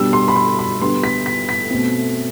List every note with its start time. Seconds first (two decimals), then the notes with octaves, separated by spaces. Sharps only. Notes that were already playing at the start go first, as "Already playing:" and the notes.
Already playing: B2 G3 D4 E6
0.13 C6
0.28 B5
0.36 C6
0.59 B5
0.81 D3 G3 B3 C6
1.04 B6
1.26 B6
1.49 B6
1.70 B2 A3 C4